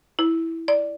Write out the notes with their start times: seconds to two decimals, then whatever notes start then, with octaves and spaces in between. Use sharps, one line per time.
0.19 E4
0.68 D5